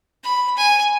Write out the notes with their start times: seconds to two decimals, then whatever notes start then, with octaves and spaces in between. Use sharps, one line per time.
0.24 B5
0.57 G#5